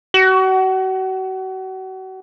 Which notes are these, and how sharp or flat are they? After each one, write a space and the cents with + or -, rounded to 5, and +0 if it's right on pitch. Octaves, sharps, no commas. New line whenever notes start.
F#4 +35